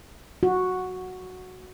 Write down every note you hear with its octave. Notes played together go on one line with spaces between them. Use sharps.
F#4